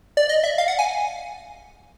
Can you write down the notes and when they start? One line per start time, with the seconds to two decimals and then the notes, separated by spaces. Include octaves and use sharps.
0.17 D5
0.29 D#5
0.43 E5
0.58 F5
0.68 F#5
0.79 G#5